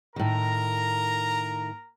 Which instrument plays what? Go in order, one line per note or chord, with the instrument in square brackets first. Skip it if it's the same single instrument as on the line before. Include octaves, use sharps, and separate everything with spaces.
[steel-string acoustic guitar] A2 D#3 [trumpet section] A#4 A#5